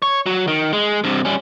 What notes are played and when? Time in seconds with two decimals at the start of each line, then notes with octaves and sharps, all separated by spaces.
0.02 C#5
0.26 F#3
0.48 D#3
0.73 G#3
1.04 G2 C3
1.25 G3 C#4